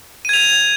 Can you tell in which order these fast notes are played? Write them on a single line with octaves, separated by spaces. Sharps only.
D#7 G#6 F7